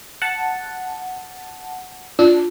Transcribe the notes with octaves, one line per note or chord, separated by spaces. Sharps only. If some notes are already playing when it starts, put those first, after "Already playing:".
F#5 A5
D4 F4